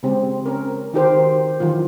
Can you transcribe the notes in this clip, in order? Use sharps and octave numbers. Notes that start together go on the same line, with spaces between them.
C#3 G#3 C4 G4
C#4 A#4
D#3 D#4 F#4 G4 A#4 C5
D#3 E3 F#3 F4